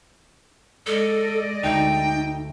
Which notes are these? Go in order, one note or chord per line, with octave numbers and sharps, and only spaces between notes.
G#3 A4 D5 D#5
D2 A3 D#4 E5 G5